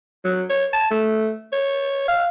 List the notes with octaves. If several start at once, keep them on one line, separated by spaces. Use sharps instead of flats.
F#3
C#5
A5
A3
C#5
F5